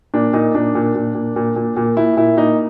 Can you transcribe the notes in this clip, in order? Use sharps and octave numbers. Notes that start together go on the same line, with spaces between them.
A#2 D4
A#2 D#4
A#2 D4
A#2
A#2
A#2
A#2
A#2
A#2
A#2 E4
A#2 E4
A#2 D#4